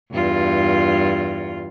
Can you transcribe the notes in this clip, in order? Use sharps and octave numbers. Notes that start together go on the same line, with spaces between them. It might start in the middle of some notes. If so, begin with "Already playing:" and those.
E2 G2 F4